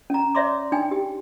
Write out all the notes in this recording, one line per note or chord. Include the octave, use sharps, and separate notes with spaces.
C#4 A#5
C#5 D5 E5 C6 D6
D4 D#4 G5 G#5
G4